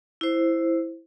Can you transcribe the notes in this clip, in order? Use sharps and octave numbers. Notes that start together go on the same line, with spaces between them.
E4 C5